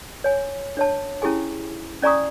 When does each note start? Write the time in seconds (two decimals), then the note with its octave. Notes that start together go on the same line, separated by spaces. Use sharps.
0.24 C#5 G#5
0.77 D4 C#5 A5
1.22 C#4 E4 G4 G#4 G#5
2.03 C#4 D5 G#5 A#5 C#6 D#6